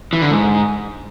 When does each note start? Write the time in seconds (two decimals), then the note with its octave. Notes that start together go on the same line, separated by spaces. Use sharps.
0.13 E3
0.22 D3
0.31 G#2